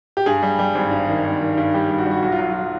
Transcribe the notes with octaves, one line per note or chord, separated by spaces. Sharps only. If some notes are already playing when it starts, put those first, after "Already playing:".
G4
G2 G#4
G3
G3
G#1
G2
D#3
G#1
D#3
G2
G3 G4
G2
F#4
G3
F#4
B1 F#4
F4
F#3
F#3 F4